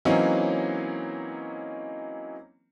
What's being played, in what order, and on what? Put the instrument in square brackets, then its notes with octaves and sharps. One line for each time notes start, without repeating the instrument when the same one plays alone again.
[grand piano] E3 F#3 A#3 C4 C#4 D#4